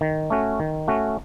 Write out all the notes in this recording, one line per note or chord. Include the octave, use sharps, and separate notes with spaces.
D#3
A3 C#4 F#4
D#3
A3 C#4 F#4